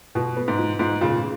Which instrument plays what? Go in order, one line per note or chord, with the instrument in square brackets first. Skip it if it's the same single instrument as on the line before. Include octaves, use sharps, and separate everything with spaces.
[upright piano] B2 [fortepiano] F4
[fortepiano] B3
[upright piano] G#2
[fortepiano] F4
[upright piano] G#2 [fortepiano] F4
[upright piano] A#2 [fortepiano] C#3